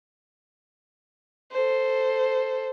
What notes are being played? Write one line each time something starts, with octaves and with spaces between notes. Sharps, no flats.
A4 C5